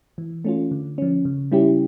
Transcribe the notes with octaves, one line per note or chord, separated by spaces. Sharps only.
E3
A3 C#4 F4
D3
F3 C#4
C#3
G3 C#4 E4 G4